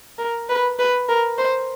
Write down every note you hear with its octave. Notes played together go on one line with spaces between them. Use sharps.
A#4
B4
B4
A#4
C5